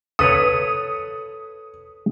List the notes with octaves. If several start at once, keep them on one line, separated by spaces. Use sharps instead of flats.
A4 B4 C#5 D#6